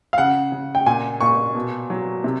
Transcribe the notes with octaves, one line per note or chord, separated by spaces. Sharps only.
F5
C#3 F#5
C#3
G5
A#2 G#5
A#2 C#6
B2
F#3
C3